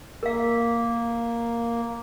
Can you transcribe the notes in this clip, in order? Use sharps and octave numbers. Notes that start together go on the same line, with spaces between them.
A#3 A#4 F5